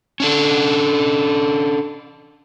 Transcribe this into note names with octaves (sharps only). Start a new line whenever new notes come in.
C#4 D4 A4